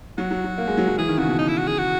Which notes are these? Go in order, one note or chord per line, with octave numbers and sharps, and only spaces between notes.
F#3 F#4
F#3
F#3
A#3
G#3
F#3
F#3
E3 G#4
D#3
C#3 F#4
B2
D#4
E4
F#4
G#4
F#4